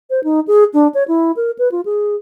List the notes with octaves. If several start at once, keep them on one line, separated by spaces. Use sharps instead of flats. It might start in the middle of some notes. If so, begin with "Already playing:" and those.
C5
D#4
G#4
D4
C#5
E4
A#4
B4
F4
G#4